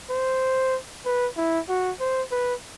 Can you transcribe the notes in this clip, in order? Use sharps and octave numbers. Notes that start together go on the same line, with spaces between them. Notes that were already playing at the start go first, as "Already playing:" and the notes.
C5
B4
E4
F#4
C5
B4